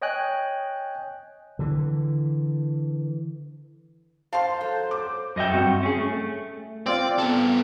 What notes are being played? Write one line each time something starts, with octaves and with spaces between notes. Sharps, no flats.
C#5 D#5 G5 G#5 F#6
D3 E3
C5 F5 A5 C6
F#3 A4
D6
F#2 D#5 E5 G5
G2 C4 F#4 F#5
C#4 G#4
A3
C4 F4 D5
B3 A4